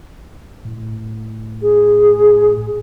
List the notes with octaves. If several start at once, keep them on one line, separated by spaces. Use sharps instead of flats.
A2
G#4